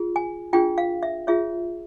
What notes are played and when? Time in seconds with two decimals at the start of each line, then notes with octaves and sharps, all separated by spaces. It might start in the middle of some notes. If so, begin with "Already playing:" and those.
Already playing: F4 G#4
0.16 G#5
0.53 D4 F4 G#4 G5
0.78 F5
1.03 E5
1.27 F4 G#4 C#5 E5